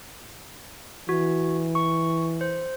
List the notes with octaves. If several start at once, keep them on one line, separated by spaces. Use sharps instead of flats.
E3 F#4
C#6
C5